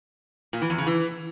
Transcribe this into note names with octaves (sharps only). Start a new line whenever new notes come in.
A#2
E3
E2
C#3
E3